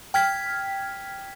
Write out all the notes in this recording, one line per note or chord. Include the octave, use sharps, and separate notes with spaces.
G5 F6 G#6 B6